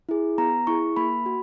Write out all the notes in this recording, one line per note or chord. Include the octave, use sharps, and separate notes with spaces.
E4 G#4
B3 A#5
E4 G#4 C#6
A#3 B5
F#4